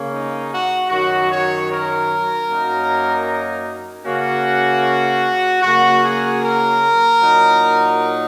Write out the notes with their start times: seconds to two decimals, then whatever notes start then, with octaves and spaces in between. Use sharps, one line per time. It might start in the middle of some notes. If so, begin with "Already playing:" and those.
Already playing: C#3 A#3 C#4
0.11 D#4
0.50 F#4
0.89 F#2 D#3 F#3 F#4
1.29 C#5
1.68 A#4
2.47 F#2 F#3 A#3 D#4
4.04 C#3 A#3 C#4 F#4
5.62 C#3 F#3 A#3 F#4
6.02 G#4
6.41 A#4
7.20 A#2 F#3 D#4